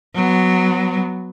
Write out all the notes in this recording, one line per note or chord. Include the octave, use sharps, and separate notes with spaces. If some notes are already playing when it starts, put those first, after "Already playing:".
F#3 B3